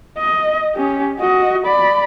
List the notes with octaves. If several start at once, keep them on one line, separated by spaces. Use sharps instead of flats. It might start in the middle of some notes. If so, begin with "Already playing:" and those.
D#5
C#4 G4
F#4 D#5
D5 B5